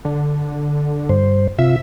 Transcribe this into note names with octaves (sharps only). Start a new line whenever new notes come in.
D3
G2 C5
C3 F4 E5